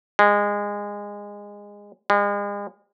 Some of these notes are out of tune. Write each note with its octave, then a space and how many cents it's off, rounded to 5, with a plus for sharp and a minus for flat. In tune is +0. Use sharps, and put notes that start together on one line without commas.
G#3 -20
G#3 -40